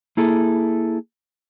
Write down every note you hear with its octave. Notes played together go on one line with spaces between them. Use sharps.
A#3 E4 G#4 A4